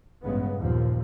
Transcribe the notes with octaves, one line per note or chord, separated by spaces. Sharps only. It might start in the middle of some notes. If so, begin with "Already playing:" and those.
A1 G2 A#2 C#3 G#3 B3
F#1 D#2 A#2 F3 A#3